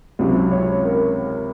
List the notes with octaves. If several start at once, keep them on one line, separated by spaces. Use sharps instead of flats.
C#2 C3 F#3
C#5
A#4